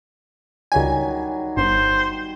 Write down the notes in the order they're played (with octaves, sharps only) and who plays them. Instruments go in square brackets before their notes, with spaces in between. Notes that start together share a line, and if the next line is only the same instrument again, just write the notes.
[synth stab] C#2 G#5 [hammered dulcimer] D#3 F#3 G3
[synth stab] G1 [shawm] C5